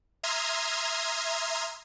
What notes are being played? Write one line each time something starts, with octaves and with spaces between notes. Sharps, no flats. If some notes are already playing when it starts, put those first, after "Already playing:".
E5 A#5 C6 D#6 F6 G#6